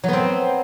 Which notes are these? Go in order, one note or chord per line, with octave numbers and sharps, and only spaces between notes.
F#3 B3 C4